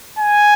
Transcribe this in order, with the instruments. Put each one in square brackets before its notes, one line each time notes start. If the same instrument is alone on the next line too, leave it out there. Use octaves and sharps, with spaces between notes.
[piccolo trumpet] G#5